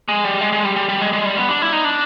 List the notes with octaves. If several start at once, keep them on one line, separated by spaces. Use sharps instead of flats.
G#3
G3
G#3
G#3
G3
G3
G3
G#3
G#3
G3
B3
D4
E4
D#4
D4